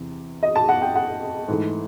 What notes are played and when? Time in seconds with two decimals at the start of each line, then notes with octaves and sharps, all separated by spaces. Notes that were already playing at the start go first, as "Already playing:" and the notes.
Already playing: E2 C3
0.43 D#5
0.56 A5
0.69 F#5
0.82 G5
0.96 F#5
1.48 G#2 E3 A3